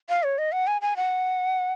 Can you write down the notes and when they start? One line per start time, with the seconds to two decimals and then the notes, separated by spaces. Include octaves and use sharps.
0.09 F5
0.23 C#5
0.38 D#5
0.52 F#5
0.67 G#5
0.82 G#5
0.96 F#5